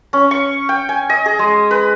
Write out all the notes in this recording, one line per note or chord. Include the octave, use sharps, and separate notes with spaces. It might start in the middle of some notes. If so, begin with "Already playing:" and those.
C#4
C#6
G5
G#5
D#5
G#4
G#3
B4